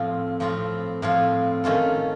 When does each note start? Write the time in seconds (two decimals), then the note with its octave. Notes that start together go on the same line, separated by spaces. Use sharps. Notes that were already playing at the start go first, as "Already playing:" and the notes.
Already playing: A2 F3 C4 F4
0.40 A2 F3 C4 F4
1.02 A2 F3 C4 F4
1.64 D#3 A3 C#4 F4 A4